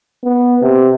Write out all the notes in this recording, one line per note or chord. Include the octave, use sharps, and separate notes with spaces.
B3
C3